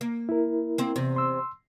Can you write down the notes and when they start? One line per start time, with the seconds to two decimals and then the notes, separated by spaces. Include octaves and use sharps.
0.01 A#3
0.29 E4 A#4
0.78 A#3 C4
0.96 E2 C3
1.16 C6 E6